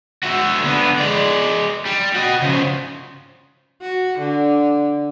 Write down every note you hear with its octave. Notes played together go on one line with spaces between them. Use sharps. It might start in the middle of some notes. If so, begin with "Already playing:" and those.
F#4 E5
D3 B3
G#3 D5
G3
F#4 D#5
C#3 F3
F#4
D3